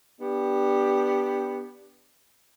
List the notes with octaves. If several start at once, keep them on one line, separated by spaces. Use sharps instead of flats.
B3 D4 G4